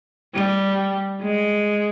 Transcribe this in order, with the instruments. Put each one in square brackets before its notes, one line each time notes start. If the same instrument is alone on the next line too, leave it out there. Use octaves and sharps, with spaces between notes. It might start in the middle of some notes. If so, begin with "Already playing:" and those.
[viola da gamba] G3
G#3